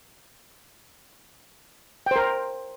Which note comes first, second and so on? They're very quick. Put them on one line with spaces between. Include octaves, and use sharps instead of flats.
G5 C5 A#4